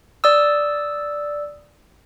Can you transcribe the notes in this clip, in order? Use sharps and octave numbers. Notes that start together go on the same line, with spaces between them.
D5 D#6 E6